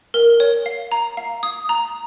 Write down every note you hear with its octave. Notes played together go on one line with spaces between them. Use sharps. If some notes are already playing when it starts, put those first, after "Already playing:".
A#4
C#5
F5
A#5
F5
D#6
A#5